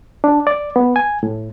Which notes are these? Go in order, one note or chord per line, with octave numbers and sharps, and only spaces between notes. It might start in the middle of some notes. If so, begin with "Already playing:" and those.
D4
D5
B3
G#5
A2